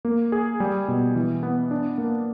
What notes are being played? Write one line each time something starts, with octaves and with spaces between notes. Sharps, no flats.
A#3
G#4
G3
B2
E3
B3
D4
A#3